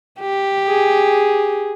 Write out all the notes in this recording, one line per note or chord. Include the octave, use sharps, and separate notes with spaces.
G4
G#4